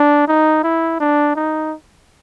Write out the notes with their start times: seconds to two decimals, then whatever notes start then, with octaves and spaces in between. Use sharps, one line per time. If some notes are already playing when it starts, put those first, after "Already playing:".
Already playing: D4
0.28 D#4
0.63 E4
1.00 D4
1.36 D#4